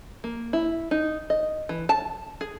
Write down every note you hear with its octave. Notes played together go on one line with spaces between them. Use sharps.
A#3
E4
D#4
D#5
E3
A5
G#4